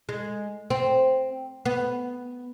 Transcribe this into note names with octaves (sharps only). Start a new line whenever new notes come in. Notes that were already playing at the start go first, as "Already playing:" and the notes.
G#3
C4
B3